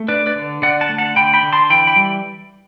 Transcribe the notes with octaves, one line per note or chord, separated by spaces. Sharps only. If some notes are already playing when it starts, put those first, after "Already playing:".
Already playing: A3
D4 B4 D5
B4 D5
D3
D3 D5 F#5
F#5 A5
A3
F#5 A5
D3 G5 B5
G5 B5
D3
A5 C6
E3 G5 B5
G5 B5
G3